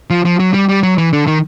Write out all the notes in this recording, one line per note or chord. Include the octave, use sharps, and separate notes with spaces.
F3
F3
F#3
G3
G3
F#3
E3
D3
D#3